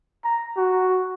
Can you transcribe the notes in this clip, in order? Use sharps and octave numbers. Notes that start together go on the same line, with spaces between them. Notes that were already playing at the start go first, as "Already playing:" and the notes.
A#5
F#4